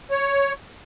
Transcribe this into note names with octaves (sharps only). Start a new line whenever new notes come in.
C#5